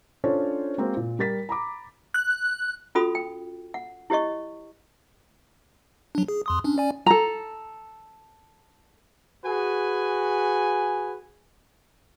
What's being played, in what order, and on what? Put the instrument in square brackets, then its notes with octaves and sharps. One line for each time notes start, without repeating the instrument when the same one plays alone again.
[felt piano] C#4 D4 F4 A4 C5 C#5
G#3 A#3 C4 F#4
A#2
G3 A#4 A6 B6
A#5 B5 D6
[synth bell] F#6
[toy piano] C#4 F4 F#4 A4 B5 D#6
G5
F#5
E4 G4 C#5 D#5 C#6
[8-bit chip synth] F#3 D4
G#4
F2 C6 D#6
C#4 D4
C#4 D5 G#5
[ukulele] A4 A#5
[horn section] F#4 G#4 B4 G#5